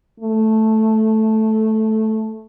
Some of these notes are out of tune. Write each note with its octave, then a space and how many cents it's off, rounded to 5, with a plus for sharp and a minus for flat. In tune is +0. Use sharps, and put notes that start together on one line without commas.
A3 -5